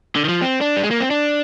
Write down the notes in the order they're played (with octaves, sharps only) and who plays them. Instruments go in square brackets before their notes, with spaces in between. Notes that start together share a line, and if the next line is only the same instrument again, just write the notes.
[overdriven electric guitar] D3
D#3
F3
C4
D4
G3
G#3
A#3
C4
D4